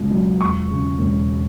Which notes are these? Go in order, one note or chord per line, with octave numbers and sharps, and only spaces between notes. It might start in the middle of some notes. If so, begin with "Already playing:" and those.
Already playing: C#2 B2
F#3
E1 C#6
C#3
E1